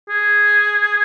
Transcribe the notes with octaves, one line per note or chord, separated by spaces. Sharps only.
G#4